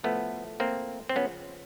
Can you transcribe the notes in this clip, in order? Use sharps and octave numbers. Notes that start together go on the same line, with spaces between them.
A2 F3 A3 B3
A#3 C4
C4
C#3 F3 B3 C#4